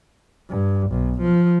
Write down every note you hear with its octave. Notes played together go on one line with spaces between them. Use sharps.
G2
B1
F3